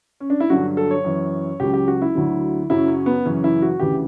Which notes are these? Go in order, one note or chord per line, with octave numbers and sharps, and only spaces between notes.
C#4
D4
E4
G2 D3 F#3 F#4
A4
C#5
F#2 E3
C#2 C#3 F#3 G4
G4
F#4
E4
D2 D3 F#3
F#2 C#3 F#3 E4
C#4
B3
F#2 C#3 E3 C#4
E4
F#4
D2 C#3 E3 G4